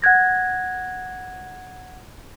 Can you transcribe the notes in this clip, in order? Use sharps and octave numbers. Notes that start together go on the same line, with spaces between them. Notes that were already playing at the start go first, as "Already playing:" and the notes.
F#5 F#6 G#6 A#6